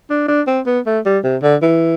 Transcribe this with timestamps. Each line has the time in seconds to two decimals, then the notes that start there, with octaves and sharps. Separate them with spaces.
0.10 D4
0.28 D4
0.47 C4
0.66 B3
0.86 A3
1.05 G3
1.24 C3
1.42 D3
1.62 E3